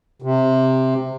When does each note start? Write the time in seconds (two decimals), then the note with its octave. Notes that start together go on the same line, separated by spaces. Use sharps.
0.22 C3